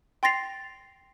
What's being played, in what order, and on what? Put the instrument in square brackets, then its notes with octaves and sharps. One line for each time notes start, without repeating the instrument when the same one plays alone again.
[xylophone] G5 C6 A6 A#6 C7 F7